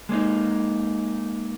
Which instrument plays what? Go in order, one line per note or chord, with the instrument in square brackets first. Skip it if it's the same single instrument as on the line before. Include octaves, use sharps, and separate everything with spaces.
[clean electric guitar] G#3 A#3 C#4 D#4